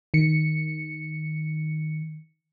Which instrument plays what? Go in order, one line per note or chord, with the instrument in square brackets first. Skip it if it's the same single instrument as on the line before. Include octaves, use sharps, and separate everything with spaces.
[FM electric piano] D#3 C#7